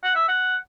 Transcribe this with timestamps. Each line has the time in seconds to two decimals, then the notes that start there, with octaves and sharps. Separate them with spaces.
0.03 F#5
0.16 E5
0.29 F#5